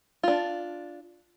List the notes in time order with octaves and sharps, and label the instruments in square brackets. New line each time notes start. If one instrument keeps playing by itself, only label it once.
[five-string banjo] D4 F4